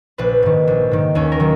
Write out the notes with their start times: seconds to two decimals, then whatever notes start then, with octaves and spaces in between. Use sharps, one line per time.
0.18 A#1 B4
0.43 G#2 D#3
0.67 A#1
0.91 G#2 D#3
1.15 D#2 C#4
1.32 A#4
1.40 D#3 F#3